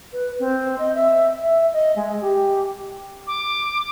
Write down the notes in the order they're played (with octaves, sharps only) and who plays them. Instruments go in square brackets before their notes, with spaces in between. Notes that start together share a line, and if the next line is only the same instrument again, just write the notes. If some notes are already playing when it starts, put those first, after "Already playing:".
[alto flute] B4
C4
D#5
E5
E5
D#5
G#3
G4
[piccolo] D6